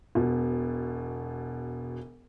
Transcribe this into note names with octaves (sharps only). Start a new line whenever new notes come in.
E1 B2